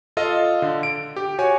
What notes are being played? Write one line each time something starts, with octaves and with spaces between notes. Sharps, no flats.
F4 A4 D#5 F5
D3
D7
G4
F#4 C#5 G#5